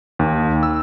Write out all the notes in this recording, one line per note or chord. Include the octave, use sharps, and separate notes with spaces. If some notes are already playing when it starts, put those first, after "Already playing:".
D#2
E6